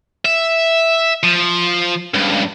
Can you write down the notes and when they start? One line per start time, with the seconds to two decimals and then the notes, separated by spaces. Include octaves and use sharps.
0.25 E5
1.23 F3
2.14 C#2 G2